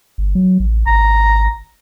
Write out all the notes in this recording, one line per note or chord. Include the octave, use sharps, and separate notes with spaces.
G1
F#3
A1
G#1 A#5